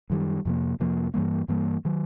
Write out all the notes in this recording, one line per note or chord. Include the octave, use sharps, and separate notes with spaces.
F#2 D#3 G3
F2 C3 F3 A#3
F2 C3 F3 A#3
G2 E3 G3 A#3
G2 E3 G3 A#3
D#3 F#3